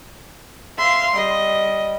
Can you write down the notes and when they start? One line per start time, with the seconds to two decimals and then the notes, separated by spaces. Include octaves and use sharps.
0.78 E5 F5 C6
1.15 G3 D#5